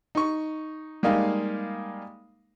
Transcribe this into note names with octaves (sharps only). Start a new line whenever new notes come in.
D#4 C#6
G3 G#3 A#3 D#4 F5